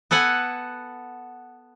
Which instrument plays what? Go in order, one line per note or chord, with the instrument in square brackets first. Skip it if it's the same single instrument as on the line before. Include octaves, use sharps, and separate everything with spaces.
[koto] B3 A4 B4 F#5 G#5